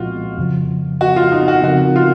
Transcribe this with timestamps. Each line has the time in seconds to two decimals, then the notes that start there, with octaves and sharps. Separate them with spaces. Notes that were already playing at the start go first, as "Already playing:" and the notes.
Already playing: C2 A#2 F3 G#3 F4 F#4
0.37 F2 C#3 F3
1.01 F#4
1.16 F4
1.32 D#4
1.48 F#4
1.63 C#3 F3 C4 D#4 F#4 A#4
1.96 F4